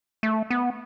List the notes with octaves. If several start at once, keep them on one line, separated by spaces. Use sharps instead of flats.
A3
B3